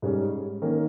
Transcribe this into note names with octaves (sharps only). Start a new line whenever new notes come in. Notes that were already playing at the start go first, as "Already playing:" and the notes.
G#2 G3 C#4 G#4
D#3 A#3 C#4